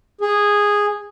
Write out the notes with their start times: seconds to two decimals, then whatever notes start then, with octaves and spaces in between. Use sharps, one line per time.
0.21 G#4